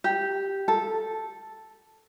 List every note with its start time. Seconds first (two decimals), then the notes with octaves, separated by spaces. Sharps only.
0.04 G4
0.68 A4